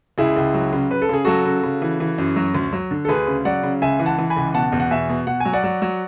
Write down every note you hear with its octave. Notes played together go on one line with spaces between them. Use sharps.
C#2 E4 G#4
C#2
F#3
C#3
C#3 B4
A4
C#3 G#4
F#3 F#4 A4
C#3
C#3
E3
E3
F#2
F#3
D2
F#3
D3
A4
D2 G#4 B4
C#3
F#3 D5 F#5
C#3
C#2 E5 G#5
E3
F#5 A5
E3
G#5 B5
C#2
B2 F#5 A5
E2
F#5
B2 E5 G#5
B2
B2 F#5
G#5
F#3
D5 F#5
F#3
F#3